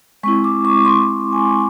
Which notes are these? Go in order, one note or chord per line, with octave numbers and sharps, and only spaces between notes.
G#3 C4 E4 C#6
D6
C#6
C6
G#5